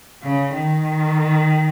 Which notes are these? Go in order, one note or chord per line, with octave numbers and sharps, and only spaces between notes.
C#3
D#3